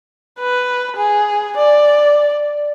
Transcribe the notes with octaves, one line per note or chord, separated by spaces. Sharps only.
B4
G#4
D5